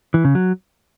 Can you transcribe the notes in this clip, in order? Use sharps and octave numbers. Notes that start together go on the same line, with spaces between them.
E3
C#3
F#3